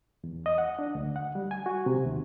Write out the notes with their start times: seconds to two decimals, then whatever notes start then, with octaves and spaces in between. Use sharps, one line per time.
0.24 E2
0.46 D#5
0.58 F#5
0.79 D4
0.95 D2
1.16 F#5
1.35 G3
1.51 G#5
1.66 F#4
1.86 C3
2.06 D#2